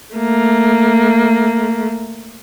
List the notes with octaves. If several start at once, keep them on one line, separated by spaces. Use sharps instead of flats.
A3 A#3